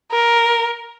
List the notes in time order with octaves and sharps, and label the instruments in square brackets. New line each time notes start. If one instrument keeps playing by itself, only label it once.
[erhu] A#4